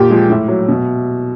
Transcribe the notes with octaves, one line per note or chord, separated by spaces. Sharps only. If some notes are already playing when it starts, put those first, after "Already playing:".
Already playing: A#2 G4
F3 G#3
A2
F#3
B2